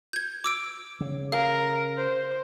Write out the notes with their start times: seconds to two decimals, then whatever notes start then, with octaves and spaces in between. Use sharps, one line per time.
0.13 G6 G#6
0.44 D6 E6 D7
1.01 C#3
1.32 A#4 F5
1.97 C5